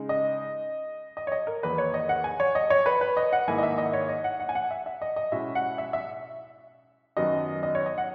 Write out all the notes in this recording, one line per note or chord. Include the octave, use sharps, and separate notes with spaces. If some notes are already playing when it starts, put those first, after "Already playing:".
Already playing: C#3 G#3 D#4
D#5
D#5
C#5
D#5
A#4
E2 D#3 A#3 D#4 B4
C#5
D#5
F#5
G#5
C#5
D#5
C#5
B4
B4
D#5
F#5
G#2 D#3 A#3 E4 G#5
D#5
E5
D#5
C#5
D#5
F#5
F#5
G#5
F#5
E5
E5
D#5
D#5
B2 G#3 C#4 E4 E5
F#5
E5
E5
F#2 D#3 F#3 B3 D#5
D#5
C#5
D#5
F#5